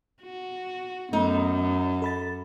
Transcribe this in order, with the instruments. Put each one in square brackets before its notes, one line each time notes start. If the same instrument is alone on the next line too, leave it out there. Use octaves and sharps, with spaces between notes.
[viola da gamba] F#4
[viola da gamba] F#2 [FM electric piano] A3 B3 [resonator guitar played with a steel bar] D#4
[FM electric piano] A4 B5 A6